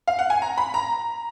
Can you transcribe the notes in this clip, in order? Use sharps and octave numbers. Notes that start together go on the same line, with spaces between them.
F5
F#5
G#5
A#5
B5
A#5